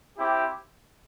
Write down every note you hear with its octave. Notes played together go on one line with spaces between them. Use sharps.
C4 E4 G4